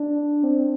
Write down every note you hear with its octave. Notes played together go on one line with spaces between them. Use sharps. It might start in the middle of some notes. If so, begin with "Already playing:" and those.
Already playing: D4
C4